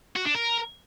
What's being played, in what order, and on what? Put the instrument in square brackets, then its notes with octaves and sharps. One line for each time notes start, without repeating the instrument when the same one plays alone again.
[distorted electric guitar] F#4
D4
A#4